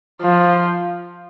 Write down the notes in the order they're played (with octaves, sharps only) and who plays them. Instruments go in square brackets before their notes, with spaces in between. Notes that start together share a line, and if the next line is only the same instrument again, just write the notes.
[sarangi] F3